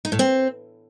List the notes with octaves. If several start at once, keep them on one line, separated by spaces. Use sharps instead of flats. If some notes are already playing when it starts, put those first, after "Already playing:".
D#4
A2
C4